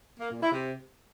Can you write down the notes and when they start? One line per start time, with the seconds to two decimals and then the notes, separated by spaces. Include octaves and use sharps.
0.20 A#3
0.31 A#2
0.41 E4
0.52 C3